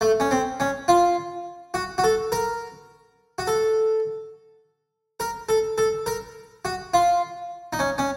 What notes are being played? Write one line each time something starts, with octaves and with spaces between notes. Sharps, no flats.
A3
C#4
C4
C#4
F4
F#4
F#4
A4
A#4
F#4
A4
A#4
A4
A4
A#4
F#4
F4
D#4
C#4
C#4